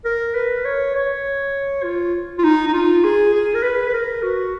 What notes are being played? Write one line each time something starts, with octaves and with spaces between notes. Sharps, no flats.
A#4
B4
C#5
C#5
F4
F4
D#4
D#4
F4
G#4
G#4
A#4
B4
B4
A#4
F#4